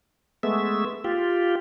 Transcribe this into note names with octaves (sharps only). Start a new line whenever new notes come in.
G#3 A3 B3 E5
F4 G4